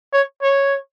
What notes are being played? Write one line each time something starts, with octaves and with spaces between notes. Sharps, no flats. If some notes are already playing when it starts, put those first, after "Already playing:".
C#5
C#5